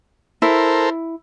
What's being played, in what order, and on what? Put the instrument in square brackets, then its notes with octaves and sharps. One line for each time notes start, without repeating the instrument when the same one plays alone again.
[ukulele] E4 [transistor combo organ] A4 A#4 C5